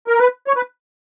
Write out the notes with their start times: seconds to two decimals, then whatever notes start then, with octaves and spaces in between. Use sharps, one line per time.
0.07 A#4
0.19 B4
0.47 C#5
0.56 B4